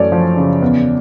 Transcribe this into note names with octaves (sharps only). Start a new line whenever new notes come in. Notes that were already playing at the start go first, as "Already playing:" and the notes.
Already playing: F#2 E3 A3 C#5 D5
F3
C#3
E2